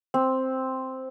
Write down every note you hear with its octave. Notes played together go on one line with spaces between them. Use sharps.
C4